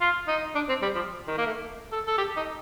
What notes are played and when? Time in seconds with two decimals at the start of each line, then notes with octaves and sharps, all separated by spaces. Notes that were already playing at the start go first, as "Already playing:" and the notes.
0.01 F4
0.28 D#4
0.55 D4
0.69 C4
0.82 G3
0.95 F3
1.28 D#3
1.38 A#3
1.46 A3
1.92 A4
2.07 A4
2.18 G4
2.37 D#4